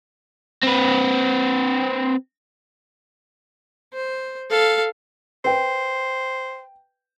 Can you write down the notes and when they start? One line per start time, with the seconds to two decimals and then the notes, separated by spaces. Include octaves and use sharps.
0.63 C4 B4
3.94 C5
4.50 A4 F5
5.45 B4 C5 G5